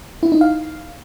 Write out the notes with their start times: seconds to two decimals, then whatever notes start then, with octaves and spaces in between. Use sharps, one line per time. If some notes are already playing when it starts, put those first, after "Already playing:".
0.23 E4
0.32 D#4
0.41 F5